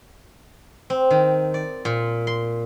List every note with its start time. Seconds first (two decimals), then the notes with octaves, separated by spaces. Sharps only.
0.90 C4
1.11 D#3
1.54 D5
1.85 A#2
2.27 C6